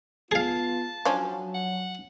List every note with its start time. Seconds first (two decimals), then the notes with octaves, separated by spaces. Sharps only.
0.31 B3 F4 G#4 F5 A5
1.05 F3 F#3 C#4 D4
1.54 F#5